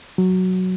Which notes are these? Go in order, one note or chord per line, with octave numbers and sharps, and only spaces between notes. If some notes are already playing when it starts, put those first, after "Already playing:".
F#3